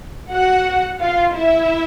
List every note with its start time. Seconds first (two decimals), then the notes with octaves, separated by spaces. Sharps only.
0.31 F#4 F#5
1.00 F4 F5
1.35 E4 E5